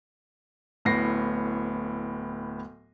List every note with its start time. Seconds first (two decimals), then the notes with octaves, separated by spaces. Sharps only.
0.85 D1 A2 B3 A#6 C7